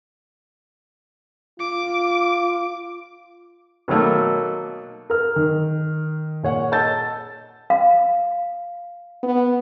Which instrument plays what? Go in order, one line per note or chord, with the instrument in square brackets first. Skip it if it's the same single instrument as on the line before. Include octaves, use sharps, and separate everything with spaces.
[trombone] F4 [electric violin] D6
[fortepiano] B2 D#3 F#3 A3 A#3
[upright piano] A#4 F6
D#3
A#2 C#5 F#5
D#5 A5 E6 G6 A6
[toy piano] F5
[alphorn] B3